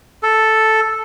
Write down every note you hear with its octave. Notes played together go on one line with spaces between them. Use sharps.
A4